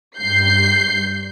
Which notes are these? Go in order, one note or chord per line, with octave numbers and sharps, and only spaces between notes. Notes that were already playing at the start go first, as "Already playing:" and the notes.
G2 G6 C7